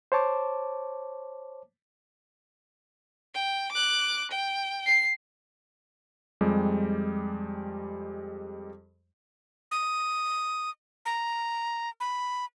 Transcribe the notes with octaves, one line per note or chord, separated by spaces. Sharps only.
C5 C#5 A5 D6
G5
D6 F#6
G5
C7
F2 G3 G#3 G4
D#6
A#5
B5